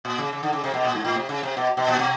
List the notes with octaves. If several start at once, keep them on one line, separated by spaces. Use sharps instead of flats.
A#2
C#3
C#3
D3
C#3
C3
B2
A#2
G#2
A2
C3
C#3
C3
B2
B2
A#2
B2